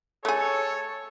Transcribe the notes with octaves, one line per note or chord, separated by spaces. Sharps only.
A3 G#4 A4 C#5